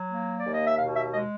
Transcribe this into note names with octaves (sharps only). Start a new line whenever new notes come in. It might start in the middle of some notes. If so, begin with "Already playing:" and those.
Already playing: F#3
A#3
D#2 D5
D#5
E5
B2 F5
E5
G#3 D#5